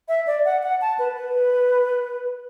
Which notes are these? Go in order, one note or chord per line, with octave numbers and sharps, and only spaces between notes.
E5
D5
F#5
F#5
A5
B4
B4